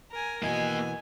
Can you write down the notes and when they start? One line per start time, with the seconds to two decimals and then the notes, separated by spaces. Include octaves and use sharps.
0.11 A#4 G#5
0.42 B2 E3 A#3 D#5 G#5